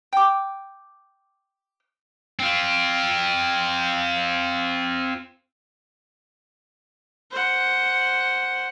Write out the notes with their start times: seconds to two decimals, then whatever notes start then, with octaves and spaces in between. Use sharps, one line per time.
0.13 G5 D6
2.39 C4 F4
7.31 C5 F#5